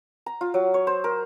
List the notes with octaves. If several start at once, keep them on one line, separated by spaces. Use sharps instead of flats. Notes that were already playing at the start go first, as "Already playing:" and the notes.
A#5
F4
F#3
C#5
C5
A#4